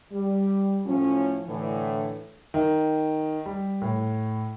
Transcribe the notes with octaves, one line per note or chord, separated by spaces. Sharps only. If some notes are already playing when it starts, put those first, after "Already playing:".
G3
A2 F3 C#4
A2 D3 E3
D#3
G3
A2